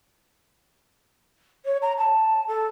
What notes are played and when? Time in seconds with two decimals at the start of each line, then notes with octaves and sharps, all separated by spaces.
1.65 C#5
1.82 A#5
1.97 A5
2.47 A4